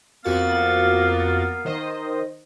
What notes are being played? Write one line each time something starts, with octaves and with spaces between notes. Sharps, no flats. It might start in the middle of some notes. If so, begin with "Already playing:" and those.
F2 A#3 B3 F#4 F5 A6
D#3 C5 D#5